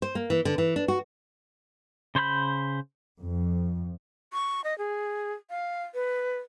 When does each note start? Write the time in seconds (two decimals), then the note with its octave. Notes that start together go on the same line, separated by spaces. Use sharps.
0.02 C5
0.15 A#3
0.30 E3
0.45 D3
0.58 E3
0.76 D4
0.88 F#4
2.15 C#3 C5 C#5 B5 G6
3.20 F2
4.33 C#6
4.64 D#5
4.78 G#4
5.50 F5
5.94 B4